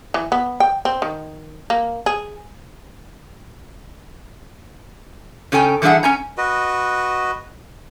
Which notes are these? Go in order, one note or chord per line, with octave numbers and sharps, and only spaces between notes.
E3
B3
G5
C4
D#3
A#3
G#4
C#3 C#4 A4 G5 G#5
E3 G3 D4 G#4 E5 F#5
C#4 G#5 A#5
F#4 B4 D#5